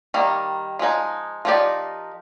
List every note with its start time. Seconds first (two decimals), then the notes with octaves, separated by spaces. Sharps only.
0.14 D#3 G3 A#3
0.79 F3 G#3 D#4
1.45 F3 A#3 D#4 G4 D5